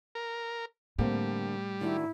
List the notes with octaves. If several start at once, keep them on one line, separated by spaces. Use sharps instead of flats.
A#4
A2 D3 G3 A#3 C4
D#3 D4 E4 F#4